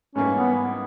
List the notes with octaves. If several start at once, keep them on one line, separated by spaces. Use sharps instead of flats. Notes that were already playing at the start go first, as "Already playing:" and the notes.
G#2 E3 G3 A#3 C#4
B3